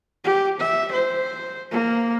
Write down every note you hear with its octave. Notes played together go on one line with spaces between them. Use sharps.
G4
E5
C5
A#3